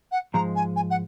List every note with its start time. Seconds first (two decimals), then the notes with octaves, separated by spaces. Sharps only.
0.12 F#5
0.34 G#2 F3 G#3 A#5
0.56 G#5
0.76 G#5
0.90 F#5